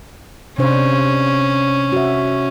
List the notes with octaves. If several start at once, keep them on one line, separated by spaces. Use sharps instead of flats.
C3 C#4 D4 C5
F#4 E5